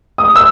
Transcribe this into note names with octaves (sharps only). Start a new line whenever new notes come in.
D#6
E6